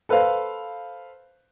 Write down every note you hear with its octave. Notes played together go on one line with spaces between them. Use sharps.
A4 B4 C5 F5